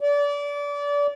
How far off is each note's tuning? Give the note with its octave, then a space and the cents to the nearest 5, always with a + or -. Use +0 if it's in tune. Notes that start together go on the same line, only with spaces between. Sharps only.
D5 -30